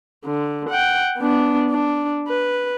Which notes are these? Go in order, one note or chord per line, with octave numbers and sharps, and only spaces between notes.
D3
F#5 G5
B3 D4
D4
B4